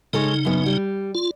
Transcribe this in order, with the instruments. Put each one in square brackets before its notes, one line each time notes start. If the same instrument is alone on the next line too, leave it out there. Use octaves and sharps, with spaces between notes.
[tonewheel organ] C#3 D#4 [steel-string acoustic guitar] G#3 A4 C#5
[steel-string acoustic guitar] F#2 B3
G3
[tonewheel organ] F4